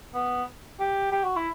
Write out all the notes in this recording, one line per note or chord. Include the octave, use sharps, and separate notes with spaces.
B3
G4
G4
F#4
E4